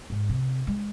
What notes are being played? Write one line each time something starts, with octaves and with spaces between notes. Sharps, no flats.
G#2
C3
G#3